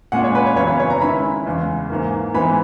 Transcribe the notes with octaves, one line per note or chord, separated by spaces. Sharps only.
A#2 G#3 C#4 F#5
C#5
B4
C#5
F#2 C#3 E3 B3 C#5
B4
C#5
A#5
D#3 G#3 C#4 E4 B5
E2 C#3 G#3
G#2 E3 A#3
G#2 E3 G#3 B3 B5